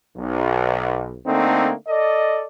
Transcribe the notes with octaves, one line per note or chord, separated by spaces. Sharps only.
B1
D3 A3 A#3 C4 D#4
A4 D5 D#5